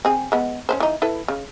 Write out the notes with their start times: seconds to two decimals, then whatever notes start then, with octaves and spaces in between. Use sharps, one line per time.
0.05 C4 G#4
0.32 G#3 B3
0.69 C#4 B4 C5
0.80 E3 D#4
1.02 E4 A4 B4
1.28 C#3